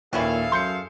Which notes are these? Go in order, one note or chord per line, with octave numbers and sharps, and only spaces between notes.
D#2 A#2 E3 C#4 E4 G#4 A4 F5
F#2 C6 G6 C#7